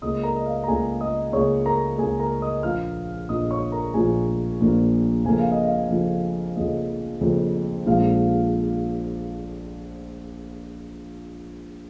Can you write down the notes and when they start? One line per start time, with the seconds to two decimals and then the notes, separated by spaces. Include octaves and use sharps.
0.02 C#2 C#3 A#3 D#5 D#6
0.23 A#4 A#5
0.36 D#5
0.46 F5
0.63 A#5
0.68 C#2 C#3 A#3 G#4 G#5
1.01 D#5 D#6
1.33 C#2 C#3 A#3 C#5 C#6
1.66 A#4 A#5
1.98 C#2 C#3 A#3 G#4 G#5
2.20 A#4 A#5
2.42 D#5 D#6
2.63 A#1 A#2 F3 A#3 F5 F6
3.29 A#1 A#2 F3 A#3 D#5 D#6
3.51 C#5 C#6
3.72 A#4 A#5
3.94 A#1 A#2 F3 A#3 G#4 G#5
4.60 A#1 A#2 F3 A#3
5.25 F2 C#3 F3 A#3 G#5
5.39 F5
5.51 D#5
5.64 F5
5.90 F2 C#3 F3 A#3
6.56 F2 C#3 F3 A#3 D#5
7.21 F2 C#3 F3 A#3
7.86 A#1 A#2 F3 G#3 F5